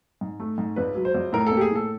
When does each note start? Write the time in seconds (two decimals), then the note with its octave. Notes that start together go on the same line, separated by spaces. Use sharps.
0.21 G#2
0.40 A3
0.58 G#2
0.76 C#2 B4
0.95 F#3
1.05 C5
1.14 C#2
1.33 A2 A#4
1.47 A#3 A4
1.57 G4
1.61 G#4
1.70 A2
1.76 A4